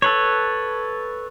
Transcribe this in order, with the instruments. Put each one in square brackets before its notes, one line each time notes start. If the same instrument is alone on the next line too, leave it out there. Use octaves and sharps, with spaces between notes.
[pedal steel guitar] A4 B4 C#5